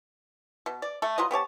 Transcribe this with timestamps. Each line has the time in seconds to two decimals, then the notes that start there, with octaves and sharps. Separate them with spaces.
0.66 B2
0.82 D5
1.02 A3 A4
1.18 F#3 F4 B4 D#5
1.31 B3 G4 C#5 A5